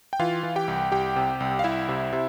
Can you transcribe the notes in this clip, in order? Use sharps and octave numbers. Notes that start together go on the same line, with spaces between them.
G5
E3 F4 F5
E3
G4 G5
C2
C2 G4 G5
C3
C2
F5
C2 E4 E5
C3
C3